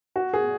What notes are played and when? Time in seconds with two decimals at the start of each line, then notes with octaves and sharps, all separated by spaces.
0.16 F#4
0.33 G#4